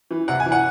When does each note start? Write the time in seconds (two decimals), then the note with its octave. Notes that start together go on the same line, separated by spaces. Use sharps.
0.11 E3
0.28 C3 F#5
0.40 G#5
0.46 E3
0.52 F#5